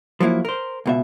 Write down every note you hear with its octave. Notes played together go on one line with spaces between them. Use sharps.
F3 F#3 A#3 E4
A#4 C5
C#2 B2 E5